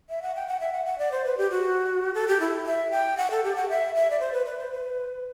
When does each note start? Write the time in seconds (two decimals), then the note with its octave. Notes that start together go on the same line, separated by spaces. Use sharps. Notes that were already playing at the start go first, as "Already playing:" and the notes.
0.09 E5
0.22 F#5
0.35 G5
0.47 F#5
0.60 E5
0.73 F#5
0.86 F#5
0.98 D5
1.12 C5
1.25 B4
1.38 G4
1.51 F#4
2.14 A4
2.28 G4
2.40 E4
2.66 E5
2.91 G5
3.17 F#5
3.31 A4
3.44 G4
3.56 F#5
3.69 E5
3.95 E5
4.10 D5
4.20 C5
4.33 B4
4.46 B4
4.58 C5
4.71 B4